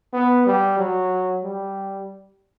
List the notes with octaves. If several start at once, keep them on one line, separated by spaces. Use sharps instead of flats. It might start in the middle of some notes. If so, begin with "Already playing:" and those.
B3
G3
F#3
G3